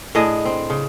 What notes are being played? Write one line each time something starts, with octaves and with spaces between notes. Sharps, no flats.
A2 D4 G#4 D#5
C4
C#3